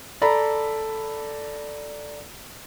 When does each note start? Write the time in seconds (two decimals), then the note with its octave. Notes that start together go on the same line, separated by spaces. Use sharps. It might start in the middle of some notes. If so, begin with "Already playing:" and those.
0.22 A4 D5 A#5 B5